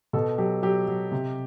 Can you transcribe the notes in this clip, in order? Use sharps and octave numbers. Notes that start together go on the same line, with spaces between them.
B2 A4
F#3 G4
F#3 G4
F#3
C3